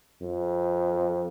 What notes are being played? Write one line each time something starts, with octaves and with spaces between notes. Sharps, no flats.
F2